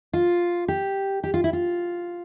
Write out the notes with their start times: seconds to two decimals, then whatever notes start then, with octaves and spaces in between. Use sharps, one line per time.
0.13 F4
0.68 G4
1.24 G4
1.34 F4
1.44 E4
1.53 F4